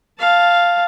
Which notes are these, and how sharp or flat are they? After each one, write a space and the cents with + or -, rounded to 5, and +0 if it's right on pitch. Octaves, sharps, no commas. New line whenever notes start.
F5 +0 A5 +0